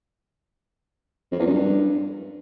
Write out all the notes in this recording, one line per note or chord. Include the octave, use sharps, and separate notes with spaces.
F2
E2
F#2
G2